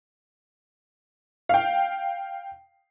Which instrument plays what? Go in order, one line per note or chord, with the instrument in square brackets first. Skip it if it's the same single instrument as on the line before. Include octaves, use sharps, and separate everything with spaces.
[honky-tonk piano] F5 G5